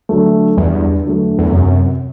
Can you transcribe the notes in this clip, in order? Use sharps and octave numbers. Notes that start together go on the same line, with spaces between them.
D3 F#3 A3
E2 G2
D3 F#3 A3
E2
F#2 C3